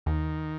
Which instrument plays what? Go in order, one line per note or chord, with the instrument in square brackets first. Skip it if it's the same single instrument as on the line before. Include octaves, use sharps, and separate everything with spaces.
[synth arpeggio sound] D#2 [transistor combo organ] D#3